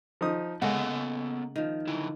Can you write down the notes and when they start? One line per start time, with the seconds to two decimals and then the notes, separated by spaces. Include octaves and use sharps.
0.21 F3 D#4 D#6
0.62 C#3 G#3 A#3 B3 A4 F#5 G#5
1.56 D#3 F3
1.87 D3 E4